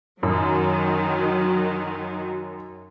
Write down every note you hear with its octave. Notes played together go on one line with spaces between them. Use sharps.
F#2 D#3 F#3